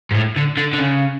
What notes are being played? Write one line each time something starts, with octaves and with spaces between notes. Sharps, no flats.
G#2
A2
D3
D3
D3
C#3